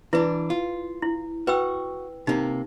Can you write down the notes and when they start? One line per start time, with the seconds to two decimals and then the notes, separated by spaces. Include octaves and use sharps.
0.13 E3 D4 E4 B4
0.50 F4
1.02 E4
1.47 F#4 B4 G5 E6
2.27 C3 A#3 D#4